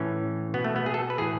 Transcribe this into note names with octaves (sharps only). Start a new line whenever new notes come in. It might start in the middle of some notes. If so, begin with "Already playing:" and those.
Already playing: A2 E3 C#4
B2 B3
A3
B3
G#4
A4
B4
A2 E3 G#4